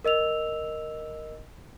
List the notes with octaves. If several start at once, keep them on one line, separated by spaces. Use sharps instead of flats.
A#4 D#5 E6 F7